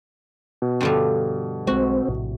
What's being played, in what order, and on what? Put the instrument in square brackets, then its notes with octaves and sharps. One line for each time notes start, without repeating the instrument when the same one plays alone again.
[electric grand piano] B2
[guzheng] G2 D3 F3
[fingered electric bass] B1 G#3 [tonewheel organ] C4 [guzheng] F#4
[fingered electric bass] A#1 A2 C3